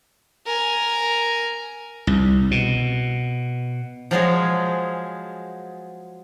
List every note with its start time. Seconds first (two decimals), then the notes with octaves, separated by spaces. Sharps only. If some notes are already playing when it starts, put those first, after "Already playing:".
0.46 A#4 G#5
2.07 C2
2.51 B2
4.11 F3 F#3 G#3 G#4